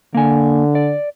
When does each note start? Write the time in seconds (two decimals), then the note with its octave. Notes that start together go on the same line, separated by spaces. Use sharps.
0.15 D3 A#3 G#5
0.75 D5